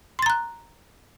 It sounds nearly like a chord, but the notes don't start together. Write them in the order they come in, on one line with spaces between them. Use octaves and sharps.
C6 A6 A#5 F#6